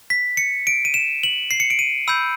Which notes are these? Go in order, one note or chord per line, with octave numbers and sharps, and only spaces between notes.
B6
C#7
D7
D#7
E7
F#7
C7
C#7
D7
D#7
B5 E6 G6